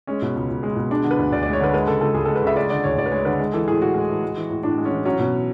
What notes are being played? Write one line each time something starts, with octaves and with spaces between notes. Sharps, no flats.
G#3 C#4
B2
C#2
C#2
G#3
B2
G#3 D4
D3
B4
D2
D2 D5
D5
G#3
C#5
D3 B4
G#3 B4
C#3 A4
C#2 A4
C#2 G#4
A4
G#3
B4
C#3 E5
G#3 D5
D3 D5
D2 C#5
D2 D5
B4
G#3 C#5
D3 B4
G#3
E3 A4
A2 G#4
A2 F#4
G#3
E3
G#3
E3
A2
A2 D4
G#3
C#4
E3
F#3 C#4
B2